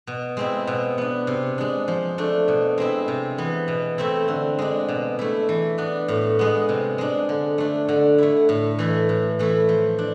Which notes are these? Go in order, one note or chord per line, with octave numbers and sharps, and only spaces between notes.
B2
G#3 C4 E4
B2
B3 D4
C3
G#3 D4
F3
A3 D4
B2
G#3 C4 E4
C3
E3 B3
B2
A3 C4 E4
D3
G#3 D4
B2
A3 E4
E3
B3 D4
A2
G#3 B3
C3
G#3 D4
D3
A3 D4
D3
A3 E4
A2
E3 A3 E4
A2
E3 A3 E4
F3
D4